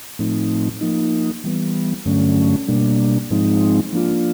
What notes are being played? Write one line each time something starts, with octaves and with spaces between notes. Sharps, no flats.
A2 F3 A3 C4 D#4
F3 A#3 D#4
E3 G3 B3
G2 D3 F#3 A3 C#4
B2 G3 A#3 D4
G#2 F3 G#3 C4 D#4
F3 A#3 D4 F4